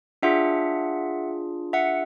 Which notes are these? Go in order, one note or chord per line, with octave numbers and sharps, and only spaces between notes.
D4 F4 G#4 E5 F#5
E5 F#5